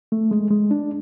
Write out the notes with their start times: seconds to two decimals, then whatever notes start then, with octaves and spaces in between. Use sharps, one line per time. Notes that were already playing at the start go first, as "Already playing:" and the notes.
0.12 A3
0.31 G#3
0.51 G#3
0.71 D4